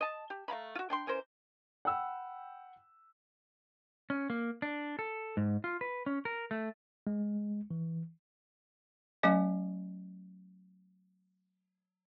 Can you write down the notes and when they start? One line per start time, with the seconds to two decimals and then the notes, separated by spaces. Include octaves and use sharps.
0.01 D#5 A5
0.30 G4
0.48 A3 F5 A#5 B5
0.75 F4 F#4
0.90 D4 G5 C6
1.07 E3 C#4 A#4 C5
1.85 F#5 G5 B5 E6
4.10 C#4
4.30 A#3
4.62 D4
4.99 A4
5.37 G#2
5.64 F4
5.81 B4
6.06 C#4
6.25 A#4
6.51 A3
7.07 G#3
7.71 E3
9.23 F#3 A3 C#4 D#5 G#5